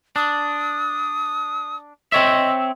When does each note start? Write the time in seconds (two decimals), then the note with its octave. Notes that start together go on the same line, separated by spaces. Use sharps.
0.16 D4 D#6
2.12 C4 C#5 D#5 E5